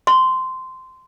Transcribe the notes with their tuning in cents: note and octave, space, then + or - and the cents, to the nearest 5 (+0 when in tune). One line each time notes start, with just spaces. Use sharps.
C6 -15